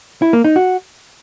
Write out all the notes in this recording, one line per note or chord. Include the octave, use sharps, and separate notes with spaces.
E4
A#3
D#4
F#4